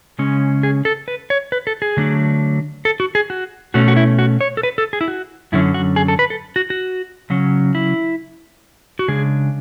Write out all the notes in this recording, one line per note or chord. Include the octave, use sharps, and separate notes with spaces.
C#3 G#3 C#4
G#4
A4
B4
C#5
B4
A4
G#4
D3 F#3 A3 D4
A4
F#4
G#4
F#4
B2 A3 C#4 F#4
F#4
E4
F#4
C#5
A4
B4
A4
G#4
E4
F#4
F#2 D3 F#3 C#4 E4
F#4
G#4
A4
B4
A4
F#4
F#4
C#3 F#3 C#4
E4
F#4
C#3 G#3 D4 G#4